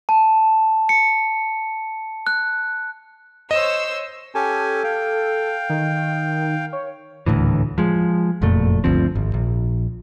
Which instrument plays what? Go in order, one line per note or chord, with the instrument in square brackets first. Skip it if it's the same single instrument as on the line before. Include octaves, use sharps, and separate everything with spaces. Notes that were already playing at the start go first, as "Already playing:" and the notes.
[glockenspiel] A5
C#7
F#6
[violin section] C5 C#5 E6 [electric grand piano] D#5
[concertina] C#4 G4 G#5 [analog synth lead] A4
[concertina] F5 G5
[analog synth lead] D#3
C#5
[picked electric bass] D#1 D2 A2 E3
F3 G#3
F#1 F2 A#2 A3
G1 D2 F3 C4
G#1
A#1